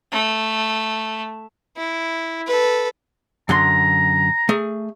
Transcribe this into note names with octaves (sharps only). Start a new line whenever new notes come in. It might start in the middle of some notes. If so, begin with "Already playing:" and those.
A3
E4
A4 B4
F#2 D3 A#5 C6
A3 G#4